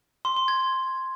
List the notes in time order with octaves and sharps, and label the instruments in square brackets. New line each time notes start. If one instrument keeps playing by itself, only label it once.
[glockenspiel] C6
C6
G#6